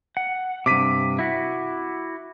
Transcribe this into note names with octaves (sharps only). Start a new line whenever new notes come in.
F#5
G2 C3 D6 B6 D#7
E4 F#4